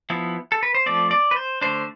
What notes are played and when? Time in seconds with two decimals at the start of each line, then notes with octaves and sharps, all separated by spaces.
0.10 F3 B3 E4
0.52 A4
0.63 B4
0.74 C5
0.86 F3 A3 C4 D5
1.11 D5
1.31 B4
1.36 C5
1.61 D3 A3 D4 C5